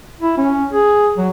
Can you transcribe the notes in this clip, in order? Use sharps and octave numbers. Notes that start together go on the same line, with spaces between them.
E4
C#4
G#4
F#3